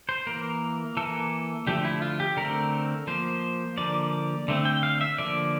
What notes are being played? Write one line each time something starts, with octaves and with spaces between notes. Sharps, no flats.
C5
E3 A#3 A#4
E3 A#3 A4
D3 F3 A3 G4
E4
F4
G4
D3 A3 C4 A#4
F3 A#3 C5
D3 F3 A#3 D5
D3 A3 C4
G5
F5
E5
D3 F3 A#3 D5